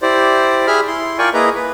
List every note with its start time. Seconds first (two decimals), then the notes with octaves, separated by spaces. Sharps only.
0.02 E4 G4 C5 D5
0.67 G4 G#4 E5 B5 F6
0.87 E4 C6
1.18 F4 A#4 D5 G5 G#5 C#6
1.34 A#3 E4 G#4 B4 D#5 A#5
1.56 B4